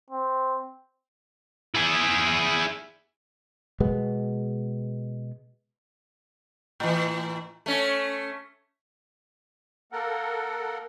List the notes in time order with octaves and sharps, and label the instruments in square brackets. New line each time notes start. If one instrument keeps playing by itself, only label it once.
[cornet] C4
[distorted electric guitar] E4 G#4
[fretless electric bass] B2 G#3 B3
[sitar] A2 E3
A3 C#4
[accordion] A#3 A4 A#4 F#5